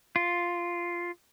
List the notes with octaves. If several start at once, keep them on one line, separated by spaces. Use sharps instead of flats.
F4